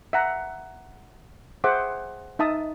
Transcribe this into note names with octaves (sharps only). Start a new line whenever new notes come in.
E5 F#5 A#5
G#4 C5 E5 F#5 D6
D#4 E5 A5 D#6